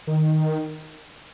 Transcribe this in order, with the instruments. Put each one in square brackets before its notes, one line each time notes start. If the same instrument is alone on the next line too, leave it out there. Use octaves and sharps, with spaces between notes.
[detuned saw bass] D#3